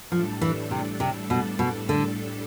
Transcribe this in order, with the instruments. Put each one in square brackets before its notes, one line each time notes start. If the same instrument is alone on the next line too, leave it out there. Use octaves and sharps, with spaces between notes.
[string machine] A2 G3 D4 A4 [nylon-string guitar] F3
[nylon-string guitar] E3
C3
C3
B2
B2
D3